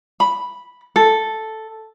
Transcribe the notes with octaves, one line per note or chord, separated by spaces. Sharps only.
B5
A4